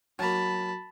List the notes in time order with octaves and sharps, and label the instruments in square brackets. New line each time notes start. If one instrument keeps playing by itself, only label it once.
[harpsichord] F#3 A#3 [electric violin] A5 B5